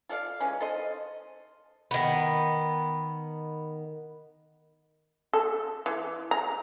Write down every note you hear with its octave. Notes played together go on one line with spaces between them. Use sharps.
F4 A4 D5 F5
E3 G#3 C#4
A4 C5 D#5
D#3 B3
A4
E3
A#5